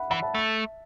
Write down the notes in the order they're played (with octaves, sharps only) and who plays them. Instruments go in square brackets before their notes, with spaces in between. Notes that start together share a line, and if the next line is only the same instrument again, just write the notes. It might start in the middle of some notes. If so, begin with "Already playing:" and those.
Already playing: [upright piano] E5 F#5 B5
[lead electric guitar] E3 [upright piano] F#5 B5
[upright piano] E5 A5
[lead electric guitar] A3